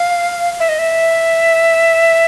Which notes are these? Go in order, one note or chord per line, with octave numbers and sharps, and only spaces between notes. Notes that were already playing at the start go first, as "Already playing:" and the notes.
Already playing: F5
E5
D#5
E5